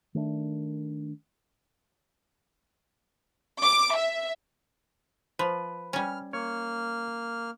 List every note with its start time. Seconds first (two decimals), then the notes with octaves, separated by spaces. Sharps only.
0.15 D#3 A3 A#3 D4
3.62 D6
3.95 E5
5.39 F3 B4
5.93 G3 C#4 F6
6.33 A#3 C#5 F6